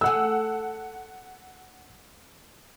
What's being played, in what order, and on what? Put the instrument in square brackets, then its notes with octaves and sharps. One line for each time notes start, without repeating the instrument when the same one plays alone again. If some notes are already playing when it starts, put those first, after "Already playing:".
[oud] A3 G#4 [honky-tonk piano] F#5 E6